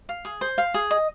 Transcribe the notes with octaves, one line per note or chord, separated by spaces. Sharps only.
F5
G#4
C5
F5
G#4
D#5